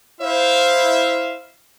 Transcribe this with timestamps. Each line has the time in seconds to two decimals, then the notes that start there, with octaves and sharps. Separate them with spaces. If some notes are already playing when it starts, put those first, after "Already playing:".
0.21 E4 C5 E5 F5